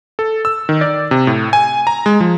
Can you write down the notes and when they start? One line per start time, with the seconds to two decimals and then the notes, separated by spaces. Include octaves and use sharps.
0.19 A4
0.45 E6
0.69 D#3
0.81 D5
1.11 C3
1.27 A2
1.53 G#5
1.87 A#5
2.06 G#3
2.20 F3